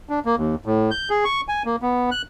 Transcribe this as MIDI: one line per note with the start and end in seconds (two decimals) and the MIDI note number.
0.09 0.20 62
0.25 0.36 58
0.37 0.55 39
0.66 0.91 45
0.91 1.09 91
1.10 1.24 68
1.24 1.41 85
1.49 1.63 80
1.65 1.76 58
1.82 2.10 59
2.11 2.22 90